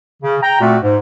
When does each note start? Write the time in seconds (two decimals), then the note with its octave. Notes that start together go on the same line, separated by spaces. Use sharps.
0.23 C#3
0.43 G5 A#5
0.60 A#2 A3 C4 F#4
0.82 G#2